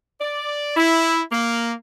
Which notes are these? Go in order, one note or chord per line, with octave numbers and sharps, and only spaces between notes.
D5
E4
A#3